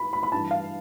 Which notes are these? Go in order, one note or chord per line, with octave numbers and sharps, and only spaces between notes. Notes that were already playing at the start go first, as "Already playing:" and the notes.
Already playing: B5
B5
B5
G2 E3 A5
F5